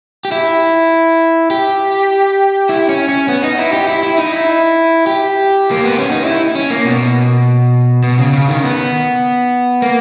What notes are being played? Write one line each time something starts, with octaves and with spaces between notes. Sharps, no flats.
G4
E4
G4
E4
C#4
C#4
B3
D#4
E4
G4
E4
E4
D#4
E4
G4
A#3
B3
C#4
D#4
E4
C#4
A#3
B2
B2
C#3
C#3
D#3
B3
A#3